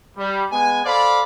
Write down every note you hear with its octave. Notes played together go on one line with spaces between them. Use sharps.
G3
G#3 B3 G#5
A4 C5 D5 F5 B5